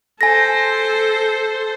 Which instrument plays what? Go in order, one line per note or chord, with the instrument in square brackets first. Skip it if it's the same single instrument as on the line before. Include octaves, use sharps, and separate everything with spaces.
[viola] A4 C5 [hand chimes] G#5 A#6